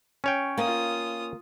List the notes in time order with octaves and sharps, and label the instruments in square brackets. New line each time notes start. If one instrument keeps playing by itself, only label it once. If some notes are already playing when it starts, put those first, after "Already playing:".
[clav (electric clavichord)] C#4 C#5 G5
[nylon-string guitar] A#3 [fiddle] F4 D#6